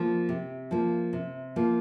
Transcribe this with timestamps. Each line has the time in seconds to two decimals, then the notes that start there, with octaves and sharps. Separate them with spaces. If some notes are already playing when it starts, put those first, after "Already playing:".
Already playing: F3 A#3
0.29 C3
0.71 F3 A#3
1.13 C3
1.56 F3 A#3